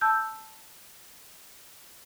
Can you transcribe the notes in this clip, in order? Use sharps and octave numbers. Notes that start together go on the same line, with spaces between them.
A5 E6 G6